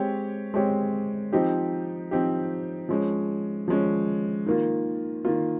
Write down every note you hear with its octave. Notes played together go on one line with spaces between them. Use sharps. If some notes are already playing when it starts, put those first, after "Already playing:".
Already playing: G#3 C4 G4 C#5
G#3 C4 G4 C#5
F3 C4 D#4 G4
F3 C4 D#4 G4
F3 G#3 C#4
F3 G#3 C#4
D#3 A#3 F4
D#3 A#3 F4